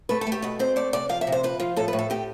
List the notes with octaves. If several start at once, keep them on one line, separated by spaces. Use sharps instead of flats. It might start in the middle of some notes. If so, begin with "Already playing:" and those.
A3 B4
A4
A3
G4
B2 B4
C4 C5
A3 D5
C3 D5
F3 F5
E5
C3
C5
F3 B4
F3 F4
A2 A4
B4
A2
A4
A2 G4